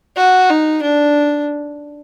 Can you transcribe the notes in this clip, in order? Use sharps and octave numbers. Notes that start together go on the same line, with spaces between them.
F#4
D#4
D4